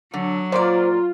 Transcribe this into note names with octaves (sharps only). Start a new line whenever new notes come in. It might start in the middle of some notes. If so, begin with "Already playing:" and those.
D3 F#3
A#2 A#3 F4 C5 D5